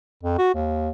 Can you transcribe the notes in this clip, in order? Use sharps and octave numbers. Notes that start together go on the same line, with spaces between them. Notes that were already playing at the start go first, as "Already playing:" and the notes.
F2
F#4
D#2